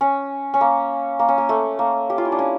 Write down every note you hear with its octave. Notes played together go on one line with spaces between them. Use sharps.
C#4
C#4
A#3
A#3
C#4
A#3
A3
A#3
G4
F4
E4
D4
C#4